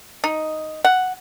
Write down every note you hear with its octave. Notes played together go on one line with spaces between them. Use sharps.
D#4
F#5